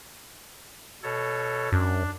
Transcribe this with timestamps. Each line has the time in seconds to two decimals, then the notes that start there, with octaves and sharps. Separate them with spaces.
1.03 B2 A4 C#5
1.72 F#2 D4